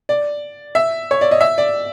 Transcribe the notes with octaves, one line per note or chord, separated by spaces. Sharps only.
D5
E5
C#5
D5
D#5
E5
D5